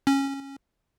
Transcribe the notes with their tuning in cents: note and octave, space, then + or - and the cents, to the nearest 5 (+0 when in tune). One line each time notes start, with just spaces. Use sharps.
C#4 -15